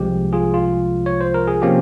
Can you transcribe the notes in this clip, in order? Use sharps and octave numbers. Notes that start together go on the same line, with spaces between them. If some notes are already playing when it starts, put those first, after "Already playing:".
Already playing: C2 C3 F3 G#3 G4
F4 G#4
F4
C#5
C5
A#4
G#4
C3 F3 A#3 C#4 G4